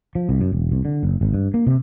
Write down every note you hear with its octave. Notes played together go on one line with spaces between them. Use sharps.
F3
C2
F#2
E1
C2
D3
F#1
G#1
G2
A#3
C3